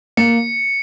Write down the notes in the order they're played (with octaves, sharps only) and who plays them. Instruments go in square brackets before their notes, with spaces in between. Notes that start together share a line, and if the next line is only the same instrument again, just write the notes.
[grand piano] A#3 [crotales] C#7